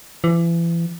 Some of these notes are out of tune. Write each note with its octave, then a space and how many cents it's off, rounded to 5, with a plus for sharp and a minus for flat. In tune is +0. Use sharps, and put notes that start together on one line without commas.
E3 +35